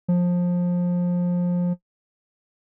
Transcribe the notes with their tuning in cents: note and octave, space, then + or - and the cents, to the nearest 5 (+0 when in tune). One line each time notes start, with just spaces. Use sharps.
F3 +20